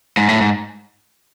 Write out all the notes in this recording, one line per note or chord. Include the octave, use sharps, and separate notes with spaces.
G#2
A2
G#2